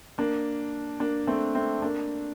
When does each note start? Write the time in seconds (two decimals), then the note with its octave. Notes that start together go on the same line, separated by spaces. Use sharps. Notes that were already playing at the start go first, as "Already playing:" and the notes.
0.18 A#3 D4
1.00 A#3 D4
1.27 A3 C4
1.55 A3 C4
1.82 A#3 D4